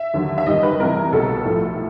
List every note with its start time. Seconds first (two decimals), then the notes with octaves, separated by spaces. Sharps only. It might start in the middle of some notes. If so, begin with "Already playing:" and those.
Already playing: E5
0.14 D#2 D3 F#3
0.38 E5
0.46 G1 F#2 D#3 G3 D#5
0.63 B4
0.80 C2 C3 E3 A#4
1.12 B1 B2 G3 A4
1.45 B1 A2 F3